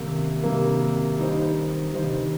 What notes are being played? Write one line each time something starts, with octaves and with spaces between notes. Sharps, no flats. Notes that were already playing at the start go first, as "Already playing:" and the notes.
Already playing: C3 D#3 G3 A#3
C3 G3 A#3
G3 D#4 C5
D#3 G3 D#4 C5
C3
D#3